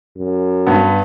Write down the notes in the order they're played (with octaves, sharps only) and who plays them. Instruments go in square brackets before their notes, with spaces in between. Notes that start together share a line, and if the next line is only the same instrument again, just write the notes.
[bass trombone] F#2
[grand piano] G2 B3